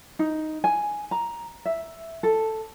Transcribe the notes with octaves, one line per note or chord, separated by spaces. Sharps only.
D#4
G#5
A#5
E5
A4